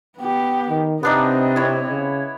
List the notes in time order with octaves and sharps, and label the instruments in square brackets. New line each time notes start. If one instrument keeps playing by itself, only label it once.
[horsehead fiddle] B3 G4
[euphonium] D#3
[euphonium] C3 [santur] B3 D4 D#4 [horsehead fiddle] C4 D#5
[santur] E4 C#5
[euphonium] C#3